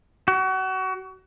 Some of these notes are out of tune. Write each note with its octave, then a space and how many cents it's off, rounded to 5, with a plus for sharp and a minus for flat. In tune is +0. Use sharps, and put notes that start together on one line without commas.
F#4 +30